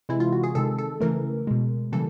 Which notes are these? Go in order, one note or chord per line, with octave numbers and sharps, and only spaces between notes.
C3 E3 G#3 E4
F4
F#4
G#4
C3 D#3 G#3 A4
A4
C#3 E3 A3 A#4
B2 G#3
C#3 E3 G3 A#3 A4